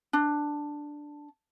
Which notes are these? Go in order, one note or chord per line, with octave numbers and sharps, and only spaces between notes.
D4